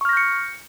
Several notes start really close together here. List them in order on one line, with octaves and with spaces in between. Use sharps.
C#6 F6 A#6 G6 C#7